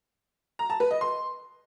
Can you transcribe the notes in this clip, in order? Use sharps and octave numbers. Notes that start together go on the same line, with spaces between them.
A#5
A5
B4
D#5
C6